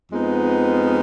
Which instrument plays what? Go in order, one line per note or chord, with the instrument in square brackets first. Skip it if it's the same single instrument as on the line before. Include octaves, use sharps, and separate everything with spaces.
[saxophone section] F2 F3 G#3 B3 D#4